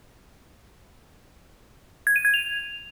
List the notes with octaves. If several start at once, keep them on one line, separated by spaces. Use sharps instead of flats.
G#6
D#7
G#6
F7